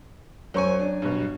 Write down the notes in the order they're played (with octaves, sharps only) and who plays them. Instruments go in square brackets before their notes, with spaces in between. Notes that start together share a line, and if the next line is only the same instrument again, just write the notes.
[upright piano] F#2 C5 C#6 [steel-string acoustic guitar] F#3 G#5
[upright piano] D4
G2 B2